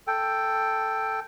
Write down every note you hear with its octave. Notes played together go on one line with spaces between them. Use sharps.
A4 G5